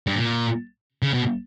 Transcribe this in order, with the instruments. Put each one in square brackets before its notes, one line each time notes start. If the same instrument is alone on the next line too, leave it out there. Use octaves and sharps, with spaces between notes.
[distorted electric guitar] G2
A#2
C#3
B2